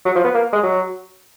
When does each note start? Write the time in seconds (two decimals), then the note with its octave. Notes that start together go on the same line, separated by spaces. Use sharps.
0.05 F#3
0.16 F3
0.24 B3
0.34 A#3
0.53 G#3
0.63 F#3